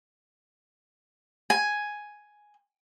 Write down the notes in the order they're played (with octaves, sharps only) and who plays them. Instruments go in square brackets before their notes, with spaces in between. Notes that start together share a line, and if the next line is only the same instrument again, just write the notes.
[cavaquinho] G#5